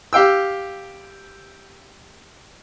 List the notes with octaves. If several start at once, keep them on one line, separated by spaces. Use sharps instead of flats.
G4 F5 G5 E6